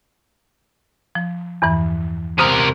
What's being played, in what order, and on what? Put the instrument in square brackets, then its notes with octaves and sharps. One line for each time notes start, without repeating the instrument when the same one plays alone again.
[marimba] F3
E2 G2 E3
[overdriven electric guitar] C3 A#4 [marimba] C5 D#6 F6